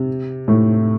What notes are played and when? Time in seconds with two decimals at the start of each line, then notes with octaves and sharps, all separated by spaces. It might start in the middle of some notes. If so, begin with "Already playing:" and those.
Already playing: C3
0.48 A2 A3